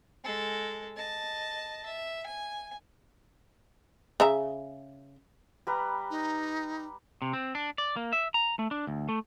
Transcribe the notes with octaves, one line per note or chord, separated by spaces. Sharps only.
G#3 A4
D#5 A5
E5
G#5
C#3 E5 A#5
G3 B4 A#5
D#4
C3
C4
D4
D5
A#3
E5
A#5
A3
D4
D2
A3